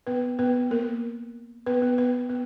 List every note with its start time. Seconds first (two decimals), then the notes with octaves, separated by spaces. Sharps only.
0.07 B3 B4
0.39 B3 B4
0.71 A#3 A#4
1.66 B3 B4
1.82 B3 B4
1.98 B3 B4
2.30 B3 B4